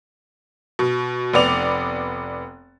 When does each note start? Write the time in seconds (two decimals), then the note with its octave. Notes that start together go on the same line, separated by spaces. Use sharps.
0.79 B2
1.33 F1 B3 D5 F7